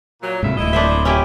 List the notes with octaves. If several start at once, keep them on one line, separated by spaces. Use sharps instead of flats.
A#2 F#3
G#2 C3 E4 F4 E5
D1 E4 D#5
D4 C5 E5
C#4 E4 G4